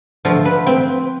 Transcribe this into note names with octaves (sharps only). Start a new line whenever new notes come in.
D3 F3 A3 F4
B4
C4